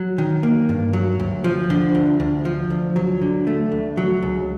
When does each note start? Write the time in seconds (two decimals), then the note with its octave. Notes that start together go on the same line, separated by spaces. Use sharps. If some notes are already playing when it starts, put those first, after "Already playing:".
Already playing: F#3
0.18 D#3
0.43 A#3
0.69 G2
0.93 F#3
1.20 D2
1.44 F3
1.70 D3
1.95 D2
2.20 D2
2.45 F3
2.70 D2
2.96 F#3
3.21 D3
3.47 A3
3.72 D2
3.97 F#3
4.23 C#2